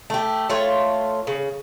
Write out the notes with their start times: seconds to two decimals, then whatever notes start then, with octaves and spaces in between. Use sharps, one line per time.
0.10 A3 G4
0.49 A3 F4 C#5
1.27 C#3